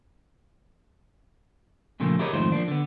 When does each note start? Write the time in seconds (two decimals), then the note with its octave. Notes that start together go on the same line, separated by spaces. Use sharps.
2.00 A#2 C#3 F3 A3 A#3
2.19 E4 G4 G#4 A#4 C#5 D#5
2.33 F2 G#2 D#3 A3 F4 C5
2.52 F3 A#3 D4
2.68 D3 B3